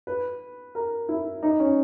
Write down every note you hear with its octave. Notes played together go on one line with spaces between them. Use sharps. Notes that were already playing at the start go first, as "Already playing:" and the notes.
B4
A#4
E4
D#4
C#4